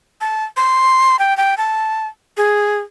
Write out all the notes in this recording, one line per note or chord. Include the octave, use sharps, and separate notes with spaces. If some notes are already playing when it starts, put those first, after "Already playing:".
A5
C6
G5
G5
A5
G#4